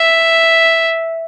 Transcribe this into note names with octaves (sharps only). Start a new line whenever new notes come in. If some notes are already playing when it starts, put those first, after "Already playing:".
Already playing: E5